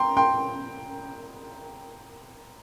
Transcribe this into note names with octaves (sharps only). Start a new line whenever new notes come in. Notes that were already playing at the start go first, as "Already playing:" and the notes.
Already playing: G5 A#5 C6
G5 C6